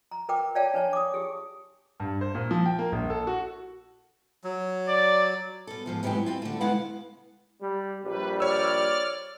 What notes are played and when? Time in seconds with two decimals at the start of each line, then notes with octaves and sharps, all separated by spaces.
0.11 A#5
0.29 A#4 B4 G5 D6
0.55 C#5 D5 F5 G5 A5
0.74 D4 B4 C#5 A5
0.93 D6 D#6
1.14 G4 G#4
2.00 G2
2.21 C5
2.35 A#2
2.51 F3
2.66 G5
2.79 A#3
2.92 A#1
3.10 A4
3.27 F#4
4.44 F#3
4.88 D5
5.67 B2 A4
5.86 G#2 F3 F4
6.03 G#2 E3 F#3 G#3 C4 G4
6.26 C4 F4
6.42 D3 A3
6.61 B2 G#3 B3 E4 F5 F#5
7.62 G3
8.04 A#1 G3 B4
8.40 C#5 D5 E6 F6